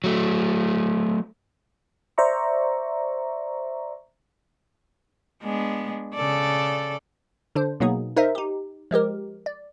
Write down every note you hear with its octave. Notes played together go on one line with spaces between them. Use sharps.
F#3 A3
C5 D5 E5 A#5 C#6
G#3 B3 D4
C#3 A4 D5
D3 D4 C5
B2 F#3 A#3 B3 D#4 G#4
D#4 A#4 C5 D#5 E5
D#4 G4
F3 G#3 G4 A#4
D5